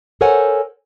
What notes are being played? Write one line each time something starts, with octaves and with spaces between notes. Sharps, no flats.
A4 A#4 C5 C#5 F#5 G#5